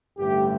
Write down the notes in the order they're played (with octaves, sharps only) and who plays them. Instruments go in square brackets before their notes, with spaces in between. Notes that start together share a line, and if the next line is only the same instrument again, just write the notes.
[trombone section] A1 G2 D3 A3 G4